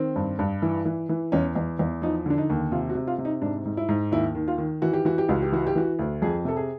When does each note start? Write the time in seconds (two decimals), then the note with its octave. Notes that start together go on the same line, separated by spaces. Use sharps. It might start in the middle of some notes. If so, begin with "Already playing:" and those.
Already playing: D#3 C4
0.16 G2
0.39 G2
0.62 E3
0.85 E3
1.09 E3
1.32 E2 C#4
1.55 E2
1.79 E2
2.02 F3 D#4
2.26 D3 D4
2.38 D#4
2.50 D#2
2.72 C3 F4
2.90 F#4
2.95 C3
3.07 F4
3.18 C3
3.25 D#4
3.42 G#2 D4
3.65 G#2
3.77 E4
3.89 G#2
4.12 D#2 E4
4.35 D#3
4.48 F4
4.58 D#3
4.82 E3 F#4
4.93 G4
5.05 E3 F#4
5.18 G4
5.29 C#2 F#4
5.42 G4
5.52 E3 F#4
5.67 G4
5.75 E3 F#4
5.99 D2
6.22 F2 G#4
6.45 C3 A4
6.57 G#4